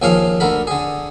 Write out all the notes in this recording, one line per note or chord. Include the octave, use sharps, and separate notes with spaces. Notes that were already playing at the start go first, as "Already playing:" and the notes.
D#2 F3 G#4 C#5 F5
D2 D3 A#4 B5
D3 G#4